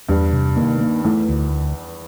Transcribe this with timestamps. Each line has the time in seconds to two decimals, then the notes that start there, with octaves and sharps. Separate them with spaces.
0.09 E2 G2 G3
0.32 C3
0.56 D#2 D#3 A#3
0.81 A#3
1.04 E2 E3 A3
1.29 D2